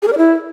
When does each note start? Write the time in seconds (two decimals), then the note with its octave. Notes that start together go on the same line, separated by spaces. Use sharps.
0.02 G#4
0.07 A#4
0.12 D5
0.18 E4